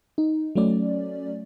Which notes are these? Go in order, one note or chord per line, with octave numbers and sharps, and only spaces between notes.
D#4
F#3 A3 C#4 D5